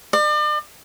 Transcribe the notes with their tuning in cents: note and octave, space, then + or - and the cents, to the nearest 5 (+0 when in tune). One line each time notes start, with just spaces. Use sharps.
D5 +40